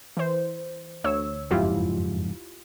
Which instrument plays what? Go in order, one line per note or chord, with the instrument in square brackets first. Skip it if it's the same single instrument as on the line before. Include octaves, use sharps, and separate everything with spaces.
[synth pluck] E3 C5
D2 C#5 E6
[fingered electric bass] F#1 F2 G#2 [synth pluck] E4 F4 G4